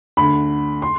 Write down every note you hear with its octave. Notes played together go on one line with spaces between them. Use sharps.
D2 D3 B5
C6